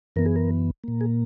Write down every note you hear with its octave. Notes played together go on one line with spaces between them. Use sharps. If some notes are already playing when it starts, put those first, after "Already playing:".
F#2 E3 B3 A#4
G#4
A#4
A#2 A#3
G#4